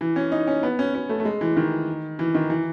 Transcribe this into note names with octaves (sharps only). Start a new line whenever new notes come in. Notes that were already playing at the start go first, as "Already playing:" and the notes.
E3
C#4
D#4
C#4
B3
C#4
C#4
A3
A3
G#3
E3
D#3
E3
D#3
E3